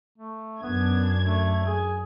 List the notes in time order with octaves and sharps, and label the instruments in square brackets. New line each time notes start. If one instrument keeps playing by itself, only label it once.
[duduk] A3
[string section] F#2 D4 G#6 [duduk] B3
[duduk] A3
G#4